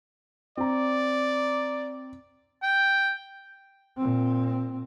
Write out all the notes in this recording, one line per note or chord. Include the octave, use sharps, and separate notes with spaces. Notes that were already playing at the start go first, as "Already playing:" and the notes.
C4 D5 A#5
G5
A#2 C4